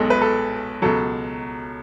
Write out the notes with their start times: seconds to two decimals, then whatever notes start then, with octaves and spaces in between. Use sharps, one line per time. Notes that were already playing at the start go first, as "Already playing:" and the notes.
Already playing: B1 B2 G#3 A4
0.10 B4
0.22 A4
0.82 C#2 B2 F#3 A4